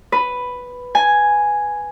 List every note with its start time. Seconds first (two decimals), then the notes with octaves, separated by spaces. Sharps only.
0.12 B4
0.95 G#5